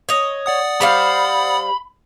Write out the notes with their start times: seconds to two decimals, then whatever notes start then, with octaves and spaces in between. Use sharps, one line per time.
0.09 C#5 D#5
0.46 D5 F#5 D#6
0.81 G3 C5 F5 B5